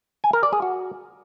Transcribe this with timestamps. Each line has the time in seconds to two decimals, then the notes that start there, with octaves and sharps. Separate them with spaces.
0.24 G#5
0.33 A#4
0.43 D5
0.53 G#4
0.62 F#4